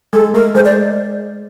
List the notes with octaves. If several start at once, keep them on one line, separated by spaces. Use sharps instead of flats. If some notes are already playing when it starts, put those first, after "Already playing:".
G#3 A4
A3 A#4
G#3 C5
D5